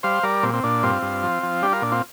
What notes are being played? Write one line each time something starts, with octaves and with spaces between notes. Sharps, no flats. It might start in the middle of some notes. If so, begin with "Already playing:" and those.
G3 C5 F5
G3 A#4 D5
A#2 C4
C4
A#2 D4
G2 C4 F4
G2
F3
F3
G3 D4 G4
F4 A#4
A#2 D4
C4 F4